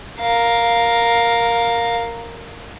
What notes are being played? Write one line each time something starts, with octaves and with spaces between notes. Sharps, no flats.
A#4 F5